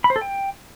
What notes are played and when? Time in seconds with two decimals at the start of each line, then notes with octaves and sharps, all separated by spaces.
0.04 B5
0.10 C5
0.16 A4
0.21 G5